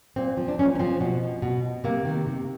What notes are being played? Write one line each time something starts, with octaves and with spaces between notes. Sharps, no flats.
A#2 C4
F3
D4
A#2 C#4
C#4
F3 C4
B2
B2
C3 A#3
D#3
C3